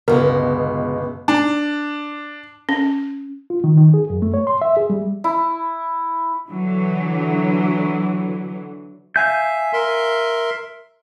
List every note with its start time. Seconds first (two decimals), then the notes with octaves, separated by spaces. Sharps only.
0.08 G1 C#2 B2 G#3 A#4
1.28 D4
2.69 C#4
3.50 F4
3.64 D#3
3.77 D#3
3.94 G#4
4.10 F#2
4.22 A3
4.34 C#5
4.47 C6
4.62 E5
4.77 G#4
4.90 G3
5.24 E4
6.49 D3 E3 F#3
9.16 E5 F5 G#5 G6
9.73 A#4 E5 C6